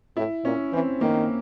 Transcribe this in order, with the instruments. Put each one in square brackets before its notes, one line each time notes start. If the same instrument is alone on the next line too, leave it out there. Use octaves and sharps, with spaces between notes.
[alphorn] A2 [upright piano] E4
[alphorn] A#2 [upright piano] C#4
[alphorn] E3 [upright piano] C4
[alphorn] D#3 [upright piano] A#3